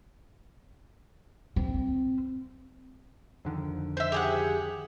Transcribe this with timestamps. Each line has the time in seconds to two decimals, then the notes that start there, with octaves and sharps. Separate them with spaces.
1.56 C4
3.45 F2 D3 D#3
3.97 C5 E5
4.12 G4 G#4 F#5